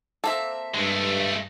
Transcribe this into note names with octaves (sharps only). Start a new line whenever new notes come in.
A#3 C4 A4 E5
G2 G#3 A3